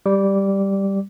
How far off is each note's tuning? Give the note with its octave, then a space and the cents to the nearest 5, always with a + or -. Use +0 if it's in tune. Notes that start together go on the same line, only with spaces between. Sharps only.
G3 +0 D6 -15